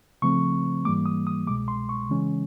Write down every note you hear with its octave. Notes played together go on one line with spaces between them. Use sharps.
C#3 F3 A3 C4 C#6
G#2 E3 G3 A#3 D6
D#6
D#6
C2 B2 G#3 D6
C6
C#6
C#3 E3 G#3 C#4